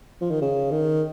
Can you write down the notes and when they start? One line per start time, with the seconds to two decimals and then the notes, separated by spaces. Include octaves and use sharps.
0.21 F3
0.31 D#3
0.41 C#3
0.71 D#3